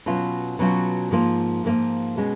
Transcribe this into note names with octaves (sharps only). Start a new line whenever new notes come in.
B2 F#3 C#4 F4
B2 F#3 C#4 F4
G#2 F3 A#3 F4
G#2 F3 A#3 F4
B2 G#3 C#4